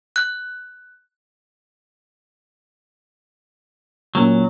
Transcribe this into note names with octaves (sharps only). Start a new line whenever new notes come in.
F#6
A#2 F#3 A#3 C#4